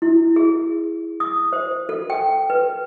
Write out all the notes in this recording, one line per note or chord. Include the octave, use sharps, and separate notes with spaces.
E4
G#4
D#6
C5
A4
G5
B4